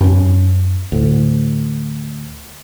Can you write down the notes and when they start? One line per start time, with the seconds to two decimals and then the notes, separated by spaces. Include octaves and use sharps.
0.01 F#2 B3 C#4
0.92 D2 A2